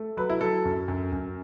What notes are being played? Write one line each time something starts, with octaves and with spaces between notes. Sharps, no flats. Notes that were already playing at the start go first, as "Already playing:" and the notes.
Already playing: A3
F#3 B4
E4
F#3 A4
F#2
F#2
F#2